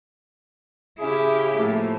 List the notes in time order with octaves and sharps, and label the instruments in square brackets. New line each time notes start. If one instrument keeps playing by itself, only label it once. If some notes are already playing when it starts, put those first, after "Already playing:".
[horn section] C#3 G#4 [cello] E4 G4
[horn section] A2 F3 A3 [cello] A#3